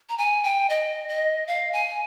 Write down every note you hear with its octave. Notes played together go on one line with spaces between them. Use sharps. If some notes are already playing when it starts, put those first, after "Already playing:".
A#5
G#5
G5
D#5
D#5
F5
G#5